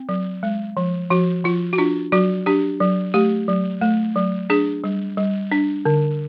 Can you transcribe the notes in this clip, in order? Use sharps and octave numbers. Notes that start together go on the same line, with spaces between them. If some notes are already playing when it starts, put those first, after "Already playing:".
Already playing: C4
F#3
G#3
F3
F3 F#4
F3 F4
F#4
D4 F4
F#3 F#4
D4 G4
F#3
A3 G4
F#3
A3
F#3
D4 G#4
G3
G3
D4
D3